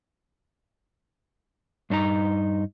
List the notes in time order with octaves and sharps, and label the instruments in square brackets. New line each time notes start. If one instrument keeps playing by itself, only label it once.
[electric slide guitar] G2 D4 D#4 A#5